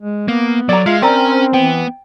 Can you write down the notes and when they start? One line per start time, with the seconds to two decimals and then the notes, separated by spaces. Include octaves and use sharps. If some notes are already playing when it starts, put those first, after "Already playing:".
0.01 G#3
0.28 A#3 B3
0.69 F#3 A4 D5 A#5
0.86 G#3 F4 E5 F5
1.02 C4 C#4 A#4 D5 G#5 A#5 B5
1.54 E3 B3 G5